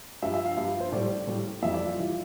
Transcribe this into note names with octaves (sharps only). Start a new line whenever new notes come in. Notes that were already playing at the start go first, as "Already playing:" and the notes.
G2 F3 E5
E5
F5
G2 F3 F5
C5
A2 G3 D5
A2 G3
F2 E3 G3 E5
D5
F4
E3 G3